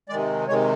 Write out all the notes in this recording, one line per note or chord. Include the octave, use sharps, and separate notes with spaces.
C3 D#3 G#3 D5
C3 D#3 G#3 C#5